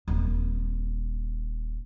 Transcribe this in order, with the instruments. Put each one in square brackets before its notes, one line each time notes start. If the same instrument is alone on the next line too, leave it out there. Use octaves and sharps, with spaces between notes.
[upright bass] D#1 C4